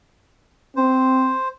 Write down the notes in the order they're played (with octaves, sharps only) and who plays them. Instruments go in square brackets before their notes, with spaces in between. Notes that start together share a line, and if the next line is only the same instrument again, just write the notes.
[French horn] C4 [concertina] C5